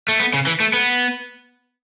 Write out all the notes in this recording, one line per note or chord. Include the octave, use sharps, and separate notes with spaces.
A3
B3
C#3
E3
A3
B3